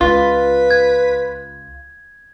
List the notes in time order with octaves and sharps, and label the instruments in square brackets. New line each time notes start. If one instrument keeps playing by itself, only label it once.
[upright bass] C#2 [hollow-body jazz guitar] F4 [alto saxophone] B4
[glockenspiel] G#6